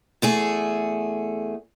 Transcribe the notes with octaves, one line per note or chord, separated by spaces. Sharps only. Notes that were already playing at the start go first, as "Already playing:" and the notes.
E2 A3 G#4